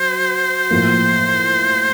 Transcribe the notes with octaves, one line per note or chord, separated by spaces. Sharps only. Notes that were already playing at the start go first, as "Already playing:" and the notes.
Already playing: F#3 C5
A2 F3 A#3